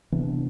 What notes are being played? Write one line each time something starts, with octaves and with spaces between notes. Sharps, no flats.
C3 E3 B3 D4